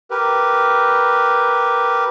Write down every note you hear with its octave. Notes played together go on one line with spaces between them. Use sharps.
G4 A#4 B4